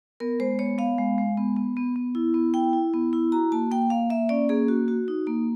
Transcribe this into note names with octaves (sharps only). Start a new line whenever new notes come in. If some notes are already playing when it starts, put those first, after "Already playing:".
B3 A#4
G#3 C5
B3 C#5
B3 F5
G#3
G#3
B3
B3
B3
B3
E4
B3
E4 G5
E4
B3
E4
F#4 A#5
A#3 A5
A#3 G5
A#3 F5
A#3 E5
C#4 D5
A#3 G#4
F#4
F#4
D#4
A#3